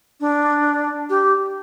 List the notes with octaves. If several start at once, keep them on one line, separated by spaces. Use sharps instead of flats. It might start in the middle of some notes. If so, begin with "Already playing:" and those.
D4
G4